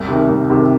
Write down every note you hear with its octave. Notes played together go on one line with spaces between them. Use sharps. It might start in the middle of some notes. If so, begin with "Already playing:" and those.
Already playing: C2
C3 D#3
C2
C3 D#3